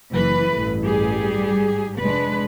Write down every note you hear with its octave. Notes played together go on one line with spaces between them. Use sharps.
F#1 E3 B4
A1 G2
G3 G4 G#4
G#2
F1 G#3 D4 B4